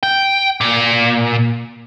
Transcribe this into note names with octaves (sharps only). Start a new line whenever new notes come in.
G5
A#2